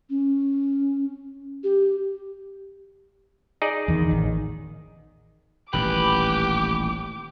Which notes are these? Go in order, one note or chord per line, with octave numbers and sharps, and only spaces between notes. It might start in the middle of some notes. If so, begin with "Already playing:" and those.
C#4
G4
D#4 G#4 D5
E2 D#3
A1 D#3
D#1 A1 D#2 G4 B4 D6